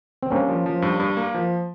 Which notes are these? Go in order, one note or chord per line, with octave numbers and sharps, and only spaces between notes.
C4
G2 A#3 C#4
F3
F3
G2
G2
A#3
F3